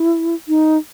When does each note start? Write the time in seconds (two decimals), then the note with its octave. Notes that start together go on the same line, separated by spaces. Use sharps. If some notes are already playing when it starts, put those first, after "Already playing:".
Already playing: E4
0.48 D#4